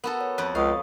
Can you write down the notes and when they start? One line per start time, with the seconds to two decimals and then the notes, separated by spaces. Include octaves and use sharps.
0.04 B3 F#4 A4 A#4
0.21 C#5
0.38 F2 B4 C#5 A6
0.55 C#2 A4 F5 C#6 D#6